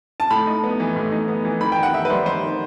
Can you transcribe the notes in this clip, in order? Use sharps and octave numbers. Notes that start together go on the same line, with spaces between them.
A5
A2 B5
D#4
B3
E3
A2
D#4
B3
E3
D#3 B5
G5
D#3
F#5
D#4 E5
B4
G3 C5
D#3 C5
D#3